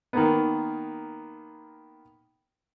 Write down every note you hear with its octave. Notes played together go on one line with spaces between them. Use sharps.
D#3 A#3 B3